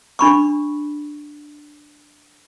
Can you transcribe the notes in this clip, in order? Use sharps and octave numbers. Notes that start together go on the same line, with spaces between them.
D4 B5 C#6